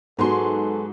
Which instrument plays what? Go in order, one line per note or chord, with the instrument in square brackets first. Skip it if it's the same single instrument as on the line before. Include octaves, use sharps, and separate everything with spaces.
[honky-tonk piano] G#2 C6 [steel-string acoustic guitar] F#3 B3 G#4 [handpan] G#3 F#4 [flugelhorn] A4